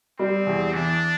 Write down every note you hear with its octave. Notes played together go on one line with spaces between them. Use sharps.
G3 C4
E2
E3 D4